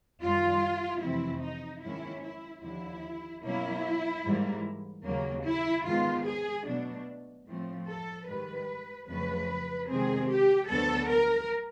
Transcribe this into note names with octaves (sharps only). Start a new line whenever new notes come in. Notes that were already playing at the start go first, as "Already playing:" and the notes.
F#2 D#3 G3 F4
F2 C3 E3 A3 C4 E4
D#4
G#2 D#3 F#3 A#3 C#4 E4
E4
D#2 D3 F3 E4
B2 F#3 A#3 C#4 E4
G#2 E3 G3 A#3
D#2 C#3 F#3 A#3
E4
G#2 D#3 G#3 B3 F4
G#4
B2 F#3 A3 D4
A2 F3 A3 C4
A4
G#2 D#3 G3 B4
F2 C#3 F#3 A3 B4
C3 D#3 G#3 C4 G#4
G4
D2 D3 F#3 B3 A4
A#4